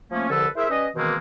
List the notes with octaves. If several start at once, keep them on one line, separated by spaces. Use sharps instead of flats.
F3 A3 A#3 C#4
C2 D3 F3 A4 B4 E6
E4 G#4 A#4 C5 E5
G3 C#4 B4 D#5
B2 D#3 E3 G#3 A#3 C4